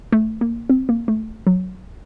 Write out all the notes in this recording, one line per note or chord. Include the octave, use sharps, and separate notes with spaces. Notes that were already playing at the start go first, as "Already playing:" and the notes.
A3
A#3
C4
A#3
A3
F#3